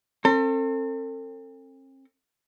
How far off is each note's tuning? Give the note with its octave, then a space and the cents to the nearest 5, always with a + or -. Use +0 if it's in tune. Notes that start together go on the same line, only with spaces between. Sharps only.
C4 +40 A4 +40